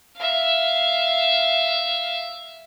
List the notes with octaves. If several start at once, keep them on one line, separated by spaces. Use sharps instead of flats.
E5 F5